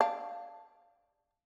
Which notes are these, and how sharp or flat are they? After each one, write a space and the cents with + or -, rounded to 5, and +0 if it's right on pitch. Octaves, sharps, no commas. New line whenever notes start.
D4 +0 F5 +0 A5 +0